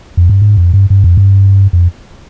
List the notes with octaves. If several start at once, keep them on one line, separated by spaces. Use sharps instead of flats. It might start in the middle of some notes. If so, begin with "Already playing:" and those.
F2
G2
G#2
F2
G2
G2
F2
G2
F2